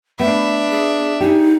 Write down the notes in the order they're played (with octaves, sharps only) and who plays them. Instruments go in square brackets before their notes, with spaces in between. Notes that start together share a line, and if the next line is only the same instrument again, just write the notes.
[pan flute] A3 [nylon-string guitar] B3 [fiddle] D4 E5
[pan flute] G#4
[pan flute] D#4 [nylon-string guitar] G4 G#4